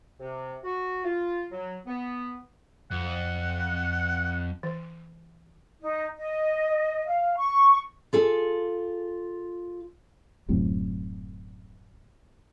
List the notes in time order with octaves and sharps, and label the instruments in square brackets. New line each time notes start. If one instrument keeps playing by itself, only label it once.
[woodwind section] C3
F#4
F4
F#3
B3
[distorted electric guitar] F2 [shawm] F#5
[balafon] E3
[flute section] D#4
D#5
F5
C#6
[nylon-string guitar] F4 G#4 A4
[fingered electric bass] D1 F#2 A2 C3